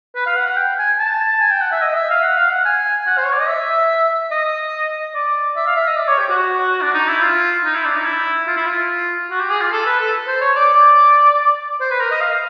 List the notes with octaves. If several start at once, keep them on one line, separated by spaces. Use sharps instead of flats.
B4
F5
F#5
F#5
G5
G#5
A5
G#5
G5
F#5
E5
D#5
E5
F5
F#5
F5
F#5
G#5
F#5
C5
C#5
D5
D#5
E5
D#5
D5
E5
F5
E5
D#5
D5
C#5
G4
F#4
D4
D#4
E4
F4
D#4
E4
D4
D#4
E4
F4
E4
F4
F#4
G4
G#4
F4
A4
B4
A4
C5
C#5
D5
C5
B4
A#4
D#5
F5